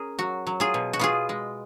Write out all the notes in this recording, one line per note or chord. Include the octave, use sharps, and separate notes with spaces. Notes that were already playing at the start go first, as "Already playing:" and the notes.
Already playing: C#4 G#4 A#4
F#3 F#4
F#3
F4 G#4
B2
F#4
B3 F4 G#4
G#3